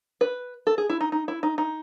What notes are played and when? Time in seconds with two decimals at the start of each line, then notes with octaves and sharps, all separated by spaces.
0.21 B4
0.67 A4
0.78 G#4
0.89 E4
1.01 D#4
1.12 D#4
1.28 E4
1.43 D#4
1.58 D#4